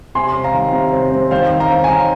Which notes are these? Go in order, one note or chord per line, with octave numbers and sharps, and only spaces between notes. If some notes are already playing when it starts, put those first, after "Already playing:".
C3 G#5 C6
C4
F5 A#5
D#3
C3
C4
C4
D#3 C5 F5
D#3
F5 A#5
C4
G#5
D#3 F5 A#5